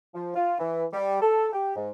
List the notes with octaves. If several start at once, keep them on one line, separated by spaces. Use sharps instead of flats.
F3
F4
E3
G3
A4
G4
G#2